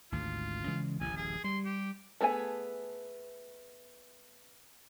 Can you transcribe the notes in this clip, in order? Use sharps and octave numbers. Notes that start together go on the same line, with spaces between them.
G#1 D2 G#2 F4
C#3 E3 G#3
D1 A1 G#5
G#4
G3 C6
G4
A3 B3 G#4 C#5 G#5